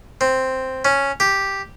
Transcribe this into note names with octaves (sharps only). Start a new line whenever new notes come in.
C4
C#4
G4